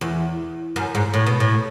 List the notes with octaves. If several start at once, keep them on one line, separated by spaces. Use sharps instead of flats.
E2
F#2
G#2
A2
B2
A2